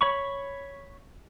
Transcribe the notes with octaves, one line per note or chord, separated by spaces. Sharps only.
C#5 B5 C#6